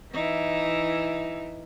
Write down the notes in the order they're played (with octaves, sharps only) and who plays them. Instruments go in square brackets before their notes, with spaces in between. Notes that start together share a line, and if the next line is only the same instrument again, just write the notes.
[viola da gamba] E3 D#4 E4